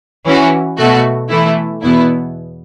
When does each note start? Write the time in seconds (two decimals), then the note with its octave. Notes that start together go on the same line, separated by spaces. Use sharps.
0.25 E3 C#4 F#4
0.78 B2 A3 F#4
1.30 E3 A3 E4
1.82 E2 B2 B3 E4